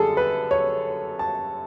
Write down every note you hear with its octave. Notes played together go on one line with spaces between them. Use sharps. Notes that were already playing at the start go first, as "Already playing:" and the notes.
Already playing: F#2 D3 G3 G#4 A4
B4
C#5
A5